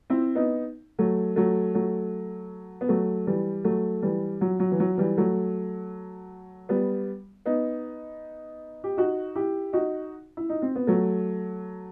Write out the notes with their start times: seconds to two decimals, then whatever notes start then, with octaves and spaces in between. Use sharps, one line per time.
0.10 C4 E4
0.35 B3 D#4
0.99 F#3 A3
1.36 F#3 A3
1.75 F#3 A3
2.81 B3
2.89 F#3 A3
3.27 E3 G3
3.64 F#3 A3
4.02 E3 G3
4.41 F#3
4.59 F#3
4.72 E3
4.80 F#3
4.98 E3 G3
5.17 F#3 A3
6.69 G3 B3
7.46 B3 D#4
8.84 G4
8.97 D#4 F#4
9.35 E4 G4
9.73 D#4 F#4
10.37 E4
10.49 D#4
10.62 C4
10.76 B3
10.87 F#3 A3